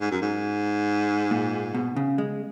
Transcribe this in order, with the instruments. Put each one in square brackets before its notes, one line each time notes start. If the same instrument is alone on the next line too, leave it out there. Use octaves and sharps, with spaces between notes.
[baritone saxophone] G#2
F#2
G#2
[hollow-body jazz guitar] A#2
B2
C#3
G#3